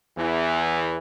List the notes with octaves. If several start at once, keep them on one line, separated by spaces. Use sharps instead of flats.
E2 E3